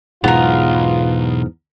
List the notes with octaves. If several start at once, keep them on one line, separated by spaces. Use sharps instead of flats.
B1 E2 G#2 B3 F4 A#4